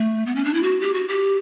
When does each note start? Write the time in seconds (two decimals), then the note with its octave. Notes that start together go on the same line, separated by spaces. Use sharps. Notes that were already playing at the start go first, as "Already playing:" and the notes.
Already playing: A3
0.26 B3
0.36 C#4
0.45 D4
0.54 E4
0.63 F#4
0.81 G4
0.94 F#4
1.09 G4